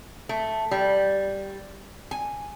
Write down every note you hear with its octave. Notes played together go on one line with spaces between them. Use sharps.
A3
G3
G#5